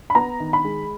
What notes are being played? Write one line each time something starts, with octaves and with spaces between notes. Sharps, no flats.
B5
B3 A#5
D#3
B5
G#3